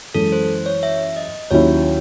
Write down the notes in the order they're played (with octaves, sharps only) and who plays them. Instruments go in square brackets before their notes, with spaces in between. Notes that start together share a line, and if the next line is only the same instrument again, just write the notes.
[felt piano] F#2 E3 G#3 C#4 [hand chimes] A4
[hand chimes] C5
C#5
E5
D#5
[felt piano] D#2 D#3 F#3 C#4 E4 [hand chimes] C#5